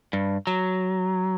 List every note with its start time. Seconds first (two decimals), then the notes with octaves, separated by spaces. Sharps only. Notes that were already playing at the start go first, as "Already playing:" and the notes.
0.13 G2
0.47 F#3